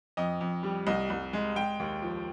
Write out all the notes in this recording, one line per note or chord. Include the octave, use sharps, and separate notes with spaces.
F2 D#5
F2
G3
C2 D#5
C2
G#3
G#3 G5
D#2
F3